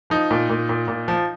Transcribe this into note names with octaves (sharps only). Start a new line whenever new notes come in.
F3 D#4
A#2
A#2
A#2
A#2
F3